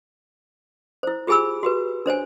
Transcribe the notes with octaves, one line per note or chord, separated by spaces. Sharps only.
E4 C5
F4 G4 G#4 G#5 B5 E6
F#4 G4 B4
D4 C5 C#5 G#5